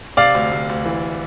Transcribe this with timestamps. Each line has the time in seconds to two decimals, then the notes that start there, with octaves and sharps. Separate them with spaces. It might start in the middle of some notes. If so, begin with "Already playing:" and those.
0.17 C3 D5 F5
0.35 D2
0.52 D2
0.70 D2
0.85 E3